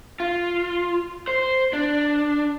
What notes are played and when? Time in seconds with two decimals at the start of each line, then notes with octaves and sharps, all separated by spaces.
0.20 F4
1.27 C5
1.73 D4